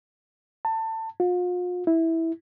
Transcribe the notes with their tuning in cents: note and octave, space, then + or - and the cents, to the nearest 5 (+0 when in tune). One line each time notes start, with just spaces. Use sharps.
A5 +25
F4 +40
E4 -10